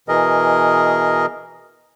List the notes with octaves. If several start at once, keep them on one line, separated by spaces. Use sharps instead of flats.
B2 E3 G#4 A#4 D#5